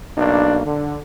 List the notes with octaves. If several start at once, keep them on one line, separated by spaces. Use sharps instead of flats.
B1 A#3 D4
D3